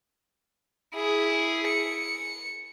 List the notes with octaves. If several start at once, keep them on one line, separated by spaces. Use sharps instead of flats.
E4 G#4
C#7